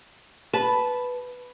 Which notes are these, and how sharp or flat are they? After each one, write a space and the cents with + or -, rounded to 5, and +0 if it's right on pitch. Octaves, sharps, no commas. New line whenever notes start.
B4 +0 A5 -15